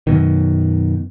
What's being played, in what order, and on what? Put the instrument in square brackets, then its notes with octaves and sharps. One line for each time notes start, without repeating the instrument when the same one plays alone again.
[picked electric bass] F#2 B2 D#3